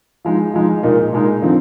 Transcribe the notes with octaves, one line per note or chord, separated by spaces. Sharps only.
F3 G#3 D#4
F3 G#3 D#4
A#2 G#3 D#4
A#2 G#3 D#4
D3 F3 C4 D#4